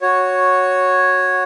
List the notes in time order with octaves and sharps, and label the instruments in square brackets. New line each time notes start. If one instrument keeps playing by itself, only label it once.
[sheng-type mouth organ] F#4 C#5